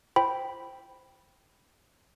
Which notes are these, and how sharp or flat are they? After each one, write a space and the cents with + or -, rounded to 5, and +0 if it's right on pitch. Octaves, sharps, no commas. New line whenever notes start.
C5 +0 G5 +0 B5 +0